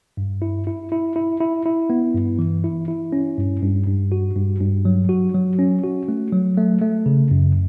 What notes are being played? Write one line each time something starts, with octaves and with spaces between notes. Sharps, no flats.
G2
E4
E4
E4
E4
E4
E4
B3
G2
E3
E4
E4
C#4
G2
G2
G2
F#4
G2
G2
F#3
F#4
F#3
C#4
F#4
A3
F#3
A3
A3
C#3
F#2